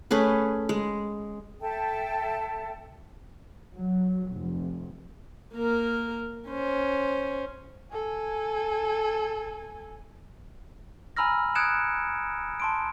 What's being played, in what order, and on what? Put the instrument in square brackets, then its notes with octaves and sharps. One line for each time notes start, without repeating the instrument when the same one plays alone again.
[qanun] A3 C#4 G#4 B4
G#3
[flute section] A4 E5 G5 A5
[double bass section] F#3
F1
[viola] A#3 A#4
C#4 C5
[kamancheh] A4 G#5
[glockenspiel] G#5 A#5 B5 E6 F6 A#6
D#6 F#6 G#6 C#7 D7 E7
A5 C6 D7